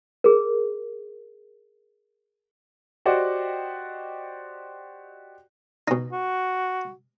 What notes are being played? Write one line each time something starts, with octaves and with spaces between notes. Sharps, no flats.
G#4 A#4
F#4 G4 C5 D5 D#5 F#5
B2 D#4
F#4